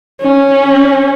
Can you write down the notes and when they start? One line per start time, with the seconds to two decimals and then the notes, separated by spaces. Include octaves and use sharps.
0.21 C#4